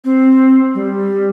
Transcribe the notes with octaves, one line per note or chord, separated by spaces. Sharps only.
C4
G3